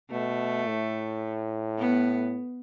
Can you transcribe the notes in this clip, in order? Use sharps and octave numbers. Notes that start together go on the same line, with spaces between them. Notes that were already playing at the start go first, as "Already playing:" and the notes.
B2 A3
A2
B3